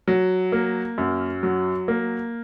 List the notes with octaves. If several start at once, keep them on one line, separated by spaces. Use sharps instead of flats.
F#3
A#3
F#2
F#3
A#3